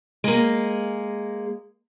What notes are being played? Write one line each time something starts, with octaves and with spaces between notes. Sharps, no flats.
G#3 A#3